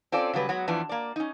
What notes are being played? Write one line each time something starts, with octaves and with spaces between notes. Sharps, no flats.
C4 C#4 F4 A4 D5
C#3 F#3 G3 B4
F#3 G#3 B3 F#4
E2 E3 F3 D4
A#3 D5
C#4 D#4